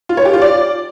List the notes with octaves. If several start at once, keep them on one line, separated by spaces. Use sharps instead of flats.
F4
C#5
G4
F4
D5